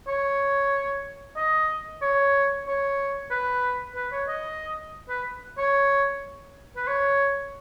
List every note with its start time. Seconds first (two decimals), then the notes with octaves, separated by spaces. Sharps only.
0.08 C#5
1.37 D#5
2.02 C#5
2.67 C#5
3.31 B4
3.96 B4
4.12 C#5
4.28 D#5
5.10 B4
5.58 C#5
6.77 B4
6.88 C#5